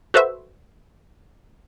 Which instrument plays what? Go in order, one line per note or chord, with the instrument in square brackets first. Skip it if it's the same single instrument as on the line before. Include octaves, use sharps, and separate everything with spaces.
[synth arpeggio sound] F#4 A4 B4 C5 E5